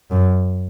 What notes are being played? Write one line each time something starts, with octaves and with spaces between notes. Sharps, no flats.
F#2